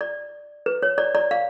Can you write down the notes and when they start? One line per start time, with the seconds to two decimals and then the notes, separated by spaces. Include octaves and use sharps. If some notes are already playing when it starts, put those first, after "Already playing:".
0.01 D5
0.66 B4
0.83 C#5
0.98 D5
1.15 D5
1.31 F5